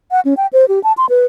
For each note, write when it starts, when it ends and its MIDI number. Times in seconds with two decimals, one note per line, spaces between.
0.11 0.20 78
0.25 0.34 61
0.37 0.47 79
0.53 0.65 72
0.68 0.82 67
0.84 0.93 81
0.98 1.06 84
1.09 1.26 71